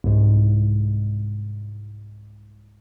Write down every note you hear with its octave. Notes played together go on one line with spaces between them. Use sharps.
C2 G#2